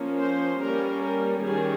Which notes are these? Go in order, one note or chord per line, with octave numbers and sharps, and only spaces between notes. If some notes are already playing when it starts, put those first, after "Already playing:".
Already playing: F3 A#3 C#4
C5
G3 A#3 C#4 A#4
A#4
D#3 G3 C#4 G#4